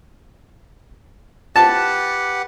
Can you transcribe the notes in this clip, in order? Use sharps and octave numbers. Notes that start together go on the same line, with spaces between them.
G4 B4 F#5 A5